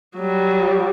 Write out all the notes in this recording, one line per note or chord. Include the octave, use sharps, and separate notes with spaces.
F#3 G3